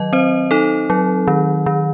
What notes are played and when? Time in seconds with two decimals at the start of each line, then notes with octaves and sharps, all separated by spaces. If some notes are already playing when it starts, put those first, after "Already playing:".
Already playing: D#3 F#3 D#5
0.13 C4 C5
0.51 D#4 A4
0.90 F#3
1.28 D#3
1.66 D#3